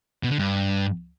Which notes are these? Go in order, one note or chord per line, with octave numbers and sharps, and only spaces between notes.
B2
D3
G2